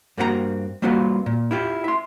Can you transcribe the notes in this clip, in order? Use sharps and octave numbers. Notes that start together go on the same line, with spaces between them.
G2 A#3 C4 F#4 G4 A#5
G3 A#3 C4 F4 F#4 B4
A#2
E4 F4 G4
E5 C6